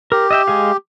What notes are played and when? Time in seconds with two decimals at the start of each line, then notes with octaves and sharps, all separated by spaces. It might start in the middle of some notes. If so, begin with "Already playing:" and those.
0.12 G4 A#4
0.31 D#5 E5 G5
0.48 G#3 G#4 F5